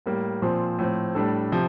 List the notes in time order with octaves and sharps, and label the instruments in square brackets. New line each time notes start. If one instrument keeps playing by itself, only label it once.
[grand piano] A2 G3 A#3
A#2 F3 C4
A2 F3 C4
A2 G3 D4 A4
C3 F3 C4